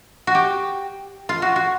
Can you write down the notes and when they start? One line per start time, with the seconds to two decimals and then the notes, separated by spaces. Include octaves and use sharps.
0.27 F#4
0.35 G4
1.29 F4
1.42 F#4
1.56 F#4